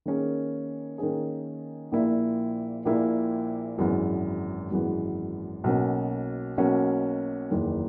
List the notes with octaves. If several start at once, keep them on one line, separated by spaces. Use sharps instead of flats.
D#3 A#3 C#4 G#4
D#3 A#3 C#4 G#4
A#1 A#2 A#3 E4
A#1 A#2 A#3 E4
G#1 F#2 E3 G#3 B3
G#1 F#2 E3 G#3 B3
B1 B2 A#3 C#4
B1 B2 A#3 C#4
F#1 E2 D#3